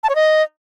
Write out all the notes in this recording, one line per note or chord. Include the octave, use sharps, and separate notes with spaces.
A5
C#5
D#5